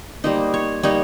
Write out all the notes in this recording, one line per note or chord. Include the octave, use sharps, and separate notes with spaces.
G3 A#3 D#4 C5
C#5
G3 A#3 D#4 C#5